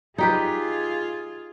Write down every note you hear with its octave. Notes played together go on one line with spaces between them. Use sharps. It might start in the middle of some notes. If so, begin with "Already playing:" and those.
D#4 F4 G4 G#4 B4